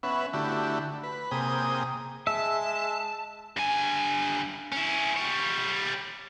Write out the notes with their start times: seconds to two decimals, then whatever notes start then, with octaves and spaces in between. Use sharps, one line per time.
0.03 B3 C#4 B4 E5 F#5
0.33 D3 A3 E4 F#4 G4
1.03 B4
1.31 C3 A#3 G#4 G5 D#6
2.27 G#3 E5 A5
3.57 G2 G#5
4.72 C#4 E4
5.16 G3 C#5